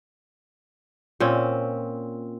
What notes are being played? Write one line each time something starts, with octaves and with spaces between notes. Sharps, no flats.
A#2 C4 C#4